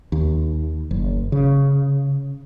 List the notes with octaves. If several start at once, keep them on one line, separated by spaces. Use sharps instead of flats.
D#2
F#1
C#3